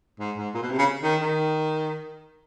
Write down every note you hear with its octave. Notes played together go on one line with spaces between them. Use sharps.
G#2
G#2
A#2
B2
C3
C#3
D#3
D#3